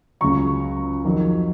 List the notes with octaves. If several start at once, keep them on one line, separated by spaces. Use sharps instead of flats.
C#2 C#3 F#3 A#5 C#6
F2 D#3 F#3